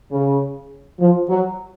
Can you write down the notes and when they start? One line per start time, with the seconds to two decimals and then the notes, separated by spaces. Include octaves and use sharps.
0.12 C#3
1.00 F3
1.30 F#3